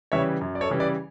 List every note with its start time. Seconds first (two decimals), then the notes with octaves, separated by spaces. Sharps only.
0.12 C#3 E3 G3 C#5 E5
0.41 F#2
0.55 D5
0.61 A4 C#5
0.70 C#3 E3 G3
0.80 B4 D5